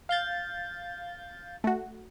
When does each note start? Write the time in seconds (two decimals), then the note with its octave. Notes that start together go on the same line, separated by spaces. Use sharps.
0.09 F5 G6 A6
1.64 A3 F#4